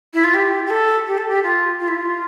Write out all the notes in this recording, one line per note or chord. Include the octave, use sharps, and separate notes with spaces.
E4
F4
G4
G4
A4
G4
A4
G4
F4
F4
E4
F4